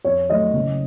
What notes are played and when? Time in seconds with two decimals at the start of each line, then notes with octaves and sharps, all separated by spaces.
0.04 F2 C#5
0.30 D#3 F#3 A3 D#5
0.54 F#1